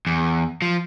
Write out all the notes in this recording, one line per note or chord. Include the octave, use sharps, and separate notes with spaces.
E2
F3